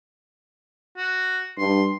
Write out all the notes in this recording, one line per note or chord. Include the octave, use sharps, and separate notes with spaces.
F#4
G2 C6